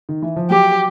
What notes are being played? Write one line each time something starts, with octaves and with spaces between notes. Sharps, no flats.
D#3
E3
F3
F#3 G4